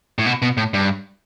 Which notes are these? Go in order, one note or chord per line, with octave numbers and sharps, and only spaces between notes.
A2
B2
B2
A2
G2